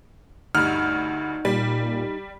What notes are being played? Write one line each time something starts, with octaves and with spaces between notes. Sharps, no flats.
D2 G2 D#4 F6
A#2 G3